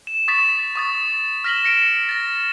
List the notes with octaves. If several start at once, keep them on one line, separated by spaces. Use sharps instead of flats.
E7
C#6 D#6 A6 B6 E7
C#6 D#6 A6
F6 A#6 B6 E7 F#7 G7
A#6 C#7 D7 E7
A6 A#6